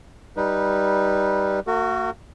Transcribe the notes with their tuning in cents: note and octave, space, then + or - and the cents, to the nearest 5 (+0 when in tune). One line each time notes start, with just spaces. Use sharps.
G3 +0 D#4 +0 B4 -20
A#3 -45 F#4 +0 A#4 -40